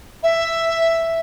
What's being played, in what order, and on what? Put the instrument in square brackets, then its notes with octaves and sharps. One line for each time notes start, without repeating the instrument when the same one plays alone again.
[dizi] E5